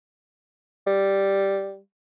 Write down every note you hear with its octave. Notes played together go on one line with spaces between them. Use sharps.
G3